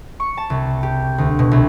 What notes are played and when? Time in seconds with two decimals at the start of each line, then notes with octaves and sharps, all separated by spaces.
0.20 C#6
0.37 A5
0.50 C2
0.83 G4
1.18 D2
1.39 B2
1.52 C2